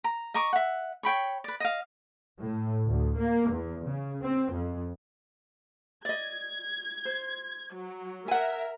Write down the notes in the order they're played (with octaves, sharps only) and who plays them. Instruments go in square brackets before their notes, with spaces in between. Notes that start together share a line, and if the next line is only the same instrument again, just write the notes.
[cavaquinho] A#5
D#5 A#5 C#6 D6
E5 F#5
C#5 G5 B5 C#6
B4 D5
D#5 F5
[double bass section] A2
D2
A#3
E2
C#3
C4
F2
[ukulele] D5 D#5 [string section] G#6
[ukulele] C5
[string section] F#3
[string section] A#4 E5 [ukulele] F#5 G#5